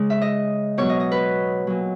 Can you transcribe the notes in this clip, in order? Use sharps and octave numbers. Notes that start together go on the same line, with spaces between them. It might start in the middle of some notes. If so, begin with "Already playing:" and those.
Already playing: C#3 G#3 C#5
E5
D#5
B2 F#3 C#5
D#5
D#5
B4
A#2 F#3